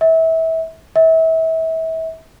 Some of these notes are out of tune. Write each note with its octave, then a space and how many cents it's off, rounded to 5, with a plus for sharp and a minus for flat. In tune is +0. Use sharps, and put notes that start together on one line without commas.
E5 -25
E5 -30